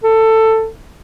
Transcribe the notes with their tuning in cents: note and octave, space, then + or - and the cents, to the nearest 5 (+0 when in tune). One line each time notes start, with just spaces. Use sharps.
A4 +15